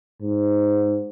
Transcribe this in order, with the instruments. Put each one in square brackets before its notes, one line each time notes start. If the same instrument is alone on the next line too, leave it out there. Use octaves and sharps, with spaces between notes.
[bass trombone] G#2